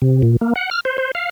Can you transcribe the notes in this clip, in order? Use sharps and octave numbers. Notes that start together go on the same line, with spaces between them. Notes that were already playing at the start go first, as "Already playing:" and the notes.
C3
A#2
A#3
F#5
F6
C5
C5
F5